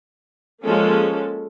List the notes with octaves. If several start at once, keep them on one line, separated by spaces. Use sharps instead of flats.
F3 G#3 A#3 C#4 A4